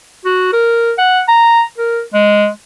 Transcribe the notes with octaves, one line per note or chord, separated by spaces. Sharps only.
F#4
A#4
F#5
A#5
A#4
G#3